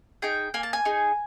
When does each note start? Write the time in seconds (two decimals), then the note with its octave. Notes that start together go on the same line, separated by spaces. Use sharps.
0.22 D#4 G#4 G5
0.54 A#3 G#5
0.63 A5
0.73 G#5
0.85 D#4 G#4